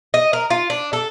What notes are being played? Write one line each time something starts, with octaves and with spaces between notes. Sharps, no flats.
D#5
A#4
F4
D4
A4